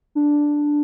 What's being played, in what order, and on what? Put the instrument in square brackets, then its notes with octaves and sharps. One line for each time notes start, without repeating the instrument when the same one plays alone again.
[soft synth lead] D4